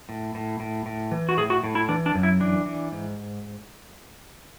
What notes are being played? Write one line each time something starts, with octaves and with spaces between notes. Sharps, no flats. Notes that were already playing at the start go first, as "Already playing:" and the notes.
A2
A2
A2
A2
E3
F#4
A2 G#4
F#4
A2
E4
E3 D4
D4
F#2
E4
E3 D4
E3
G#2